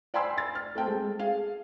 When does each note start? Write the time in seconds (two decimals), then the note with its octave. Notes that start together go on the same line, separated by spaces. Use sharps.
0.14 D5 G5 G#5 B5 C6 E6
0.34 C6 A6
0.55 F6
0.75 A3 C4 G5 A5
0.87 G#3
1.19 G#4 F5